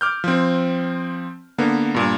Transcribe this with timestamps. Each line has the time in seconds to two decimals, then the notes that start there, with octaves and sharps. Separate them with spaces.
0.01 D6 F6 G6
0.24 F3 C4
1.58 D3 A#3 B3
1.95 G2 A#2